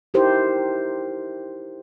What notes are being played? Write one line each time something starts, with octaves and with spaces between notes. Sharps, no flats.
D#4 E4 G4 A#4 C5